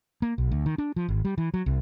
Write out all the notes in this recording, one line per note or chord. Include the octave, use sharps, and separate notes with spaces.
A#3
B1
D2
D#3
D4
F3
G#1
G3
E3
F#3
C2